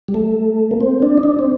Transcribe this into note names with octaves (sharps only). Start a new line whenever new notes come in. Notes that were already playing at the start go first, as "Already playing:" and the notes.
G3
A3
A#3
C4
D4
D#4
D4
C4